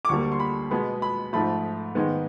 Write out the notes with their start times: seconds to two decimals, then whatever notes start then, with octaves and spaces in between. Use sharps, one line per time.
0.05 D6
0.09 D2 D3 G3 A#3 C#6
0.32 C6
0.40 B5
0.71 B2 G#3 B3 B5
1.02 B5
1.33 G#2 F3 A3 B5
1.95 G#2 D#3 G#3 B3